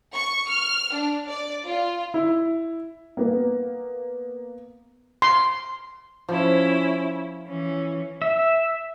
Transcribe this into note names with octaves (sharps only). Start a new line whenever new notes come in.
C#6
F6
D4
D5
F4
E4
A#3 B3
C6
F3 C#4 E4
E3 C#4
E5